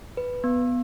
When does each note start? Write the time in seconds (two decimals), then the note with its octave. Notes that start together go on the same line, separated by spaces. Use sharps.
0.17 B4
0.44 B3